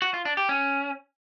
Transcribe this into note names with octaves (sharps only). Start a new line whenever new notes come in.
F#4
F4
D4
G4
C#4